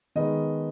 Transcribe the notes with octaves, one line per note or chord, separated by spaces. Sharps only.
D#3 G#3 B3 D#5